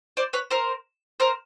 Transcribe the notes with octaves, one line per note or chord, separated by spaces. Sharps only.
C5 D5
B4 C#5
A#4 C5
A#4 C5